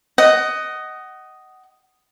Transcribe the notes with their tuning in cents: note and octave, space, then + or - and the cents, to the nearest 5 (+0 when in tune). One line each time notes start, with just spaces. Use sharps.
D#5 +0 F#5 +25